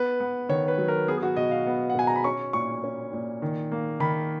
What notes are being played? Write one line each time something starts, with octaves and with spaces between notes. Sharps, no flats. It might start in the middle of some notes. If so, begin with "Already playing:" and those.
Already playing: B3 B4
B3
D#3 C#5
B4
F#3
A#4
B3 G#4
G#4
F#4
B2 D#5
F5
B3
F#5
B2 G#5
A#5
B5
C#4 C#6
A#2 C#6
C#4
A#2
D#3
A#3
D#3 B5